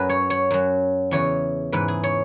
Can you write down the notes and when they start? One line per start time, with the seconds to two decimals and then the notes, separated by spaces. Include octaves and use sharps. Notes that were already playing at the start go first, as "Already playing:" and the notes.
Already playing: F#2 F#3 B4
0.09 C#5
0.30 C#5
0.51 F#2 F#3
1.11 E2 C#3 E3 C#5
1.72 G#2 E3 B4
1.88 G#4
2.04 C#5